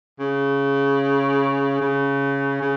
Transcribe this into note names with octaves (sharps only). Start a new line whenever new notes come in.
C#3
C#3
C#3